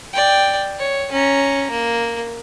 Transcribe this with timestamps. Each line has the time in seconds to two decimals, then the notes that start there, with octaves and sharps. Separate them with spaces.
0.13 D5 G5
0.79 C#5
1.12 C#4 A#5
1.71 A#3